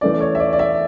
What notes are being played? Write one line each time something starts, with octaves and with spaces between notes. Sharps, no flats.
E3 A3 C#4 D5
C#5
E5
D5
D5
E5